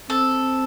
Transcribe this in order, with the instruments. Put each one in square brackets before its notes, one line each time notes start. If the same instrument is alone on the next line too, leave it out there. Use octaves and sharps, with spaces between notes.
[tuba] C4 [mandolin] A4